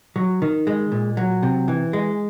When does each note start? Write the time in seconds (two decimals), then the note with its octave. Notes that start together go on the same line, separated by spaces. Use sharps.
0.16 F#3
0.42 D#3
0.67 G#3
0.92 A#2
1.17 F#3
1.43 C3
1.68 E3
1.93 G#3